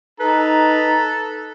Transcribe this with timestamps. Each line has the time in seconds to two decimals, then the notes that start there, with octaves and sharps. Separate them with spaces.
0.20 D#4 A4 B4 A#5